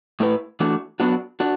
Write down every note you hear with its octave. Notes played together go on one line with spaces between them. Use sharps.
A2 A3 E4 B4
E3 A3 D4 F#4
F#3 B3 D4 F#4
D4 F#4